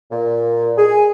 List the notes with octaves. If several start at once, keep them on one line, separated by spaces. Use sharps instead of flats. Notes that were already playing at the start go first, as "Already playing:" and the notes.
A#2
G#4